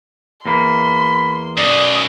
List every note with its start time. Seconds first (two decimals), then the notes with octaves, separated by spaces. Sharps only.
0.46 E2 A#3 B5 C6
1.58 F#2 B2 D5 D#6